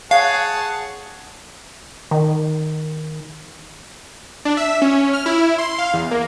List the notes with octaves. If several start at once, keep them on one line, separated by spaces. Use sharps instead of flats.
G#4 C#5 F5 F#5 A5
D#3
D4
E5
C#4
F6
E4
C6
F5
E2
A#3